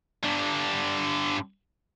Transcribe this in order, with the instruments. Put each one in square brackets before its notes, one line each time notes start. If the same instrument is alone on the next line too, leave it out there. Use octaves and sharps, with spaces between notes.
[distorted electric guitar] G2 D3